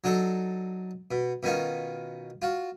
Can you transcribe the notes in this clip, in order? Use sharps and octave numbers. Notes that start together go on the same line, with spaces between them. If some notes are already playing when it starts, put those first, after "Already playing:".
F#3 D4 D#4 A4
B2
B2 D#3 C#4 D#4 F4
F4 F#4